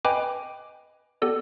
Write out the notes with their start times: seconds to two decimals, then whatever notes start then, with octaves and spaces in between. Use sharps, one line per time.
0.05 B4 D#5 G5 G#5 B5 D6
1.22 B3 G4 A4 D5